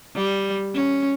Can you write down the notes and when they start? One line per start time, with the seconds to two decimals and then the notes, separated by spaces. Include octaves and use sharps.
0.15 G3
0.74 C#4